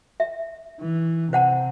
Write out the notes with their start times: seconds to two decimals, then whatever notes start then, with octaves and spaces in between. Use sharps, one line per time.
0.20 E5
0.81 E3
1.33 C3 C5 F#5 A5